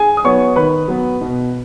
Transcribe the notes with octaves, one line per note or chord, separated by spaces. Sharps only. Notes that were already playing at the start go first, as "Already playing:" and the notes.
Already playing: G#4 G#5
D#6
F#3 B3 C#5 C#6
D#3 B4 B5
F#3 B3
B2